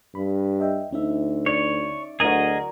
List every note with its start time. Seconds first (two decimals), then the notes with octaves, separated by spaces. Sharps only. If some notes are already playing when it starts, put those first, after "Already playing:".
0.15 G2 B5
0.60 D#5 E5 G5
0.93 D2 C#4 D#4 E5
1.46 C#5 D5
2.20 D2 F#3 G#4 A#4 D#5